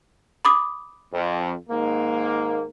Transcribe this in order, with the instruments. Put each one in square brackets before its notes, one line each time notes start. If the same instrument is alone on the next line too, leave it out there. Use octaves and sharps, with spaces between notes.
[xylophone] B5 D6 D#6
[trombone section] F2
G#2 D#3 A#3